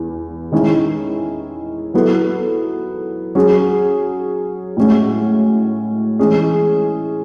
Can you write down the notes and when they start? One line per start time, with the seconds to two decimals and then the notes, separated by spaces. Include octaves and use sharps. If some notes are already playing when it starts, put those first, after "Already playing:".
Already playing: E2 E3
0.52 D#3 G#3 C#4 E4
1.94 F#3 B3 E4 A4
3.35 F#3 C#4 G#4
4.77 A2 G#3 C#4 F#4
6.19 E3 G#3 C#4 G#4